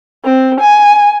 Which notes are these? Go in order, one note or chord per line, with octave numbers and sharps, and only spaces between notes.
C4
G#5